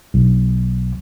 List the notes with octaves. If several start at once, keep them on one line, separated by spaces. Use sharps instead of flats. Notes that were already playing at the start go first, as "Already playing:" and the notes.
B1